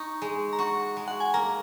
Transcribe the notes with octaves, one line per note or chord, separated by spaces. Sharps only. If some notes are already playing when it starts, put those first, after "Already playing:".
Already playing: D#4 C#6
G#3
A#5
F#4 C#6
G#3
F#5
G#5
A#3 A#5